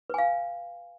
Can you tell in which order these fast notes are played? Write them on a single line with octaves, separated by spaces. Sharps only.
B4 G#5 F5